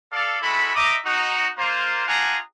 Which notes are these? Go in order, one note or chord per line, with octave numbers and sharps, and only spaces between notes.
A4 D5 F5
G#3 E4 F#4 A4 B5
D#4 D#5 E5 A#5 D6
D#4 F#4
A#3 F4 C5
D4 F4 G#4 F#5 G#5 A#5